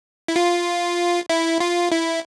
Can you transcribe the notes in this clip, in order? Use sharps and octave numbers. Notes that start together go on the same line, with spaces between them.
E4
F4
E4
F4
E4